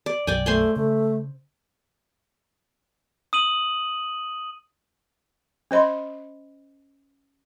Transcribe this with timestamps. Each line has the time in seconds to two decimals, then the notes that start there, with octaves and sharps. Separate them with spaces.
0.06 D5
0.27 B1 F#2 D5 G5 G#5
0.46 A3 C5 G#5 C6
0.76 C#3 A3
3.33 D#6 D#7 F#7
5.71 C#4 C5 D#5 B5 C6